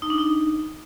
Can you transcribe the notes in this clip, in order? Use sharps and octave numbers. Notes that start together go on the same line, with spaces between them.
D#4
D4
D#4